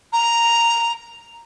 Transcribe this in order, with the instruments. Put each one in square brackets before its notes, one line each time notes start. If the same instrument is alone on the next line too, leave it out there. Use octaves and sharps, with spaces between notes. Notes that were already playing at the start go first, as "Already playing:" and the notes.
[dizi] A#5